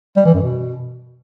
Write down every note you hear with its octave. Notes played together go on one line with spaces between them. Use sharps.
G3
E3
F#2
B2